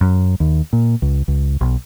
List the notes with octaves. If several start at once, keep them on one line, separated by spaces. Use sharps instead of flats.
F#2
D#2
A#2
C#2
C#2
B1